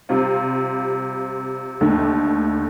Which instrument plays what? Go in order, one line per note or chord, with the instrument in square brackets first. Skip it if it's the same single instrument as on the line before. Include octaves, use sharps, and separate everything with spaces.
[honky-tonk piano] C3 G3 C4 F4
D#2 D3 A3